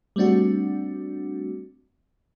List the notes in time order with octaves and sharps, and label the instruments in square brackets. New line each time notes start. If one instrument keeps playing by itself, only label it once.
[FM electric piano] G3 A3 C4 D4 F#4